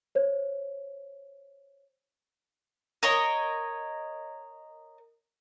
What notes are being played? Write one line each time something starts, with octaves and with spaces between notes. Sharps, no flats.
C5 C#5
A#4 C#5 D#5